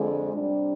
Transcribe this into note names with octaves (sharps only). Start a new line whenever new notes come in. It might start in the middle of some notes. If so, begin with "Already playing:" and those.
Already playing: F2 D3 G#3
C3 G3 D4